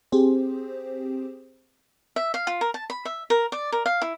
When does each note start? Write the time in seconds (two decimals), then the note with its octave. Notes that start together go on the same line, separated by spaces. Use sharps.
0.12 C4 G4 G#4 C5
2.16 E5
2.34 F5
2.47 F4
2.61 A#4
2.74 A5
2.90 B5
3.05 E5
3.30 A#4
3.52 D5
3.72 A#4
3.86 F5
4.02 E4